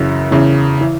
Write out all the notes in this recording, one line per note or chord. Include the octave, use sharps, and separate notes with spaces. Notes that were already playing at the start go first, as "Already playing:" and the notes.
Already playing: F#2 C#3 E3
E2 C#3 E3
E3